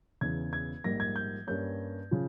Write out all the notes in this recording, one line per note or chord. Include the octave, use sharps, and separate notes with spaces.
E1 E2 C#3 G#6
G#6
A#1 G#2 G3 A#3 A#6
G#6
G6
G2 G3 A#3 C#4 G6
C#3 F3